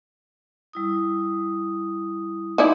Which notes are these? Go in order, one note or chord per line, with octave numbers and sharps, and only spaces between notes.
G3 E4 D#6
D#4 E4 D5 A5 B5 C6